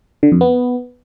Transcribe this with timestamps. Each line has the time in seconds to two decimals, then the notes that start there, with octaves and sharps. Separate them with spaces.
0.23 D3
0.32 F2
0.41 B3